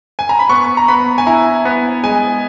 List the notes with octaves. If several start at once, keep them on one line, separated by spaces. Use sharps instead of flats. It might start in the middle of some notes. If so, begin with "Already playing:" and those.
G#5
A#5
B5
B3 C#6
A#5
B3 B5
G#5
E4 A#5
B3
G#3 G#5